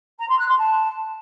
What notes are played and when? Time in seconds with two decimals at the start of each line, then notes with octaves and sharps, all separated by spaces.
0.19 A#5
0.29 C6
0.38 F#6
0.48 C6
0.58 A5